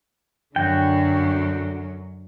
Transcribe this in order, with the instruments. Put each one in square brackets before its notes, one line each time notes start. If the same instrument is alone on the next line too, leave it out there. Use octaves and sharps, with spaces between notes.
[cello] F#2 F#3 [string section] D3 [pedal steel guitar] F#4 G5